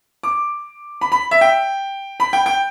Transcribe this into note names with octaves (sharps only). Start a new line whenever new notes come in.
D6
B5
B5
E5
G5
B5
G5
G5